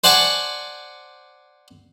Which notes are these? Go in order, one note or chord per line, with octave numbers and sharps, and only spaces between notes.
C5 D5 F#5 G#5 A5 C#6